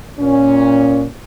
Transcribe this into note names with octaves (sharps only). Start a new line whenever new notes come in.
A#2 C#4